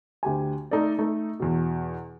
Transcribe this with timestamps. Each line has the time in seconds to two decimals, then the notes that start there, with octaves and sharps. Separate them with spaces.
0.23 D2 G4 G#5
0.71 A3 D#4 A4 D5
0.99 A3 D#4
1.40 E2 B2